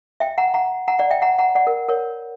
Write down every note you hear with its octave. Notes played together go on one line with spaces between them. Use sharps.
E5 G5
F#5 A#5
F#5 A#5
F#5 A#5
D5 F#5
E5 G5
F#5 A#5
F#5 A#5
D5 F#5
A#4
A#4 C#5